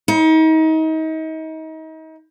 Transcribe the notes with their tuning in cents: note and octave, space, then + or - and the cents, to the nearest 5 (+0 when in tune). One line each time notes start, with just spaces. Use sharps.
D#4 +35